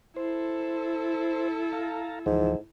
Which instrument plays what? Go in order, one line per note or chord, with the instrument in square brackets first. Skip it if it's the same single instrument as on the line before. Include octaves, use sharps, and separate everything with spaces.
[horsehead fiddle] E4 A4 [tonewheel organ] C5
[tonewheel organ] F5 A5 A#5
[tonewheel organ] D2 E3 F3 [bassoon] G#2